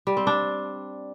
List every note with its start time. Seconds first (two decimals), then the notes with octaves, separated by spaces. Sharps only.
0.07 G3
0.17 C4
0.27 D4